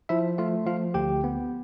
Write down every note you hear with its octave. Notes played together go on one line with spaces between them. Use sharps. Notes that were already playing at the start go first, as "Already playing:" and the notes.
F3 E4 E5
A3 F4 F5
F3 F4 F5
D2 G4 G5
B3